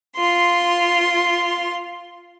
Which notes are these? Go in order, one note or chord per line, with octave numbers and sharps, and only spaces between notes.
F4 C6